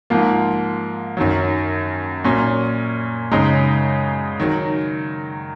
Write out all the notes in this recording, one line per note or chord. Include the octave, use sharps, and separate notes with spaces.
G#2 F3 A#3
F#2 D#3 F#3
A#2 F#3 C#4
F#2 C#3 G#3 D#4
D#3 F#3